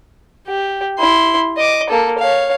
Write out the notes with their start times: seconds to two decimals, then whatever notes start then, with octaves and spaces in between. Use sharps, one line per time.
0.47 G4
0.99 E4 C6
1.57 D#5 D6
1.90 A#3 A4
2.19 C#5 F5